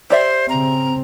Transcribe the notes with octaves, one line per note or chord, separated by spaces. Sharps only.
G4 C5 D5 E5
C#3 C4 A#5